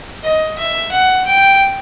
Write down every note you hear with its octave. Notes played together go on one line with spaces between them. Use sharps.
D#5
E5
F#5
G5